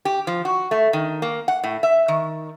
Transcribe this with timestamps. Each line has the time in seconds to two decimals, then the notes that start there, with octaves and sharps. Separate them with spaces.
0.05 G4
0.27 F3
0.45 F#4
0.71 A3
0.93 D#3
1.22 A#3
1.48 F#5
1.64 A2
1.83 E5
2.08 D#3